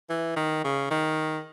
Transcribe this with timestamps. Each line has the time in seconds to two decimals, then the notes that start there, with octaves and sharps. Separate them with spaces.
0.10 E3
0.36 D#3
0.64 C#3
0.91 D#3